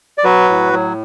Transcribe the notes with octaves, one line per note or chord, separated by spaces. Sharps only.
D5
F#3 F#4 B4
A2
F#3